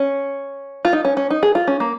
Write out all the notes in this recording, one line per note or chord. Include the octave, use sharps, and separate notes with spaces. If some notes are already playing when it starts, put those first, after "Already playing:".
Already playing: C#4
F4
D#4
C#4
C#4
D#4
G#4
F4
C#4
A#3